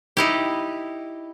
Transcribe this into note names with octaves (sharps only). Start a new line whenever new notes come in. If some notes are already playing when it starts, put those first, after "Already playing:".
D#4 E4 G4